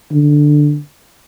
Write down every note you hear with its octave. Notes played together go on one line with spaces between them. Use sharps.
D3